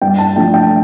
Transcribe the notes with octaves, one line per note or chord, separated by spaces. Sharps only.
G2 G5
A5
F3 A3 D4 G5
G5